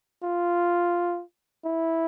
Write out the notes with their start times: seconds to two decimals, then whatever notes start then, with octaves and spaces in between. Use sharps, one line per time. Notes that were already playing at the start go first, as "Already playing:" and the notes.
0.23 F4
1.65 E4